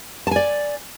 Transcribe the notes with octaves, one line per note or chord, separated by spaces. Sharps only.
D5 G#5 A5